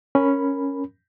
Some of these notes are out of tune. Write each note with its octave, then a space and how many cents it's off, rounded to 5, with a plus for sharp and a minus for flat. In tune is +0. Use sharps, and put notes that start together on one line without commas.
C#4 +0 A#4 +0 B5 +0